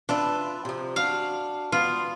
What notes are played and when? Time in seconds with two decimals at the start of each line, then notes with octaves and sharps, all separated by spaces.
0.09 D4 F4 B4 E5
0.65 C3 F3
0.96 D4 F#4 F5
1.72 B3 F4